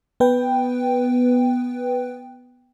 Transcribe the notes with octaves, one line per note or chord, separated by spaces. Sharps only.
B3 B4 G5